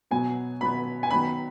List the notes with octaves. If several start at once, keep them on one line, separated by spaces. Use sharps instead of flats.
B2 F#3 B3 G#5
B2 F#3 B3 B5
G#5
D#3 F#3 B3 B5